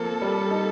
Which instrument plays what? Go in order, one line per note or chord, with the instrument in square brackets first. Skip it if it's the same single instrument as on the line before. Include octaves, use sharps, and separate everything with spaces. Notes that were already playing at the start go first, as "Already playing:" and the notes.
Already playing: [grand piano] F3 A#3 C4 [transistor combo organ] A4
[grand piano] G3
D#4